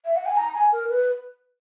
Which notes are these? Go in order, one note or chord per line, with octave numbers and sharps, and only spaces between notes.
E5
F#5
G#5
A#5
G#5
A#4
B4